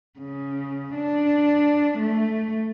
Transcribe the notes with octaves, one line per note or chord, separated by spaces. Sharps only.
C#3
D4
A3